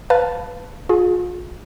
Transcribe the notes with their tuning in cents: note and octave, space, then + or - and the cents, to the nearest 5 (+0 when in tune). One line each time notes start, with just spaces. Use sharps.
B4 +5 F5 +0 A5 +0
F4 +40 G#4 +15